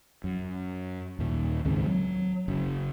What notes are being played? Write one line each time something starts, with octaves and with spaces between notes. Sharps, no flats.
F#2
D#2 A#2
C#2 G#2 D#3 C4
F#3
F#1